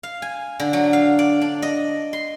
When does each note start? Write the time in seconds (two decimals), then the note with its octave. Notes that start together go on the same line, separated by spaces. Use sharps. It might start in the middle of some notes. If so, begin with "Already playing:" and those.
0.03 F5
0.22 G#5
0.60 D3
0.73 F#3
0.93 F5
1.19 D5
1.41 D4
1.62 D#5
2.13 C6